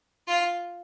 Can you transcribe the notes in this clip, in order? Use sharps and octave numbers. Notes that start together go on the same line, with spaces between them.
F4